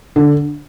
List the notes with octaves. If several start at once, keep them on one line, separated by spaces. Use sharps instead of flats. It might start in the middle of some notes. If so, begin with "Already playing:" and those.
D3